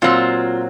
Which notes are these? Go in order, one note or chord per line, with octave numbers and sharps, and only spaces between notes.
A#2 F#3 C4 F4